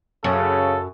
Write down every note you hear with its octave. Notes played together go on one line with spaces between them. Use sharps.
F#2 C#3 A4